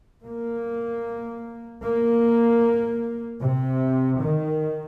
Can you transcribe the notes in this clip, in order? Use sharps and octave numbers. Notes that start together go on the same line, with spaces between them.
A#3
A#3
C3
D#3